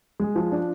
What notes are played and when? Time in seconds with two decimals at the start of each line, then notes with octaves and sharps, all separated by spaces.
0.20 G#3
0.36 F3
0.52 D4